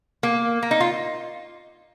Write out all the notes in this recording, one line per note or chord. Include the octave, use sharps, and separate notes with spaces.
A#3
A#3
D#4
F4